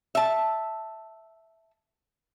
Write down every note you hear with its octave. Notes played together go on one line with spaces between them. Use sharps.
E5 A5